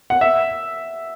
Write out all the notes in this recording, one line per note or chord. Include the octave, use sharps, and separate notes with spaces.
F#5
E5